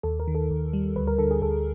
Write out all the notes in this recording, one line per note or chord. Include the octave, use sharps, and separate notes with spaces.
D#2 A4
A#4
D#3
A4
D#2
G3
D2 B4
A#4
D3 A4
G#4
D2 A4